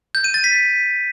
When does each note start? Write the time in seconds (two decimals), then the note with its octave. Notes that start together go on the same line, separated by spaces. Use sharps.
0.15 G6
0.24 D#7
0.34 A6
0.44 B6